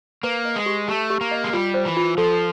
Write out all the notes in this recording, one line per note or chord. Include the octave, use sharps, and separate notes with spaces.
A#3 B4
D#5
G#3
G4
A3 G4
G4
A#3
D#5
G#3
G3 F4
C5
E3
F4
F3 A4